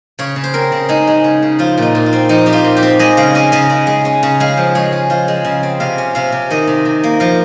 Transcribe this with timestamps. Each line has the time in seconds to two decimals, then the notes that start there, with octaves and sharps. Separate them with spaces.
0.19 C#3 C#5
0.36 C#3
0.44 C5
0.54 C4 A#4
0.72 C#3
0.89 G#3 D#4
1.07 G#3
1.24 C#3
1.42 C#3
1.59 F3 F4
1.78 A#2 D#4
1.95 A#2
2.06 F4
2.13 C4
2.29 F3 D#4
2.46 C4 G4
2.53 F4
2.65 A#2
2.77 G4
2.83 C4
2.99 G#3 D#5
3.17 C#3 F5
3.35 C#4 D#5
3.52 C#3 D#5
3.70 C#3
3.87 G#3
4.05 C#4
4.23 C#3
4.40 G#3 F5
4.57 F3
4.75 G#3 C#5
4.92 G#3
5.10 F3 F5
5.28 G#3
5.45 C#3
5.63 C4
5.80 C3 F5
5.98 C#4
6.15 C3 F5
6.32 C3
6.50 D#3 D#5
6.67 C3
6.85 C3
7.04 A#3
7.20 F3 F5